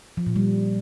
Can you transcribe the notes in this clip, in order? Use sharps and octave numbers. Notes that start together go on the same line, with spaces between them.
F3
A#2
G3